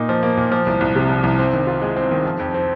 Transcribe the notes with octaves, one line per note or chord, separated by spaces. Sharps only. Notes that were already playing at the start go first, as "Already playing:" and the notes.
Already playing: A#2 A#3 D#4
F3
A#3
A#2
F3
C2
C2
C3
F3
C2
C4
D#3
F4
G#3
C4
D#3
F3
F2
C4